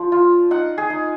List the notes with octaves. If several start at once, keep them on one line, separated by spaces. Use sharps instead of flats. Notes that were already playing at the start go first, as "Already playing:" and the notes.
Already playing: F3 D4
F4
D#4 F#5
G#4
D#4